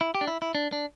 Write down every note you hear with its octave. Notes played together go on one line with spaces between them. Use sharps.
E4
G4
D4
E4
E4
D4
D4